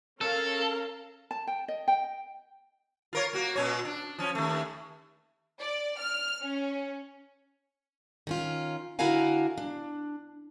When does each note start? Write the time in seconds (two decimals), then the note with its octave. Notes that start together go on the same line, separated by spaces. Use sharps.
0.21 C#4 A4 A#4 F5
1.31 A5
1.47 G5
1.68 D#5
1.88 G5
3.13 F4 A#4 C#5
3.33 A#3 F#4
3.56 A#2 C#4 C#5
3.85 D4
4.19 F3 C#4
4.35 D#2 A3
5.61 D5
6.00 F6
6.42 C#4
8.27 D#3 C#4 F4
8.99 D3 E4 F#4 A#4 F5 G#5
9.58 D4